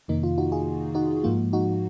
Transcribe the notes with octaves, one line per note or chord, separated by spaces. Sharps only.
F2 C3 D#3 A#3 D#4
F4
D#4 F#4
F4 G#4
D#4 F#4
G#2 F3 A#3 F4
D#4 F#4